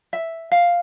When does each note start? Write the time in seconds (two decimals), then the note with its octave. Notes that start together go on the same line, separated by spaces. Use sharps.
0.13 E5
0.52 F5